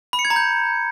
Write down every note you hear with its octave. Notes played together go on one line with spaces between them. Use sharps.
B5
C#7
G#6
A#5
G6